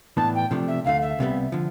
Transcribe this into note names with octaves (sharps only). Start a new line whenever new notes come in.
A2 E3 B3 D4 A5
G5
C3 F3 A3 D4
E5
D2 D3 A3 F5
E5
C2 C3 G3 B3
D3 F3